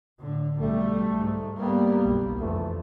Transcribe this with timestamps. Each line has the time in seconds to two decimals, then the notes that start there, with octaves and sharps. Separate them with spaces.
0.20 A2 D3
0.59 B1 G3 A3
1.16 G#2
1.58 G3 A#3 B3
2.05 F#1 B1
2.40 F2 D3 E3 A3